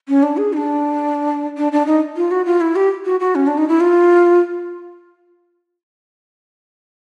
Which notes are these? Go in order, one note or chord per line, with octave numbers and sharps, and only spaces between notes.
C#4
D4
G#4
D#4
D4
D4
D4
D#4
F4
F#4
F4
E4
G4
F#4
F#4
C#4
D4
D#4
E4
F4